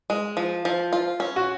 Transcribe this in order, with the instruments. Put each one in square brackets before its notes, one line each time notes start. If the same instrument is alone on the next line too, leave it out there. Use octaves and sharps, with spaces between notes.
[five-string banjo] G#3
F3
F3
F4
C#4
[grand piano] F#4